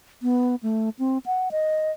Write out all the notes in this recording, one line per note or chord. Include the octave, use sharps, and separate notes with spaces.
B3
A3
C4
F#5
D#5